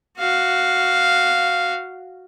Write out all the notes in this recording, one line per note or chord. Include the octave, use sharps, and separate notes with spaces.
F#4 F5